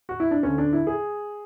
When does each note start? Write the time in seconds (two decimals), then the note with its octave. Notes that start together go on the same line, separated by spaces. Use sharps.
0.09 F#4
0.20 E4
0.31 D4
0.43 D2 D3 A3 C#4
0.58 D4
0.73 E4
0.87 G#4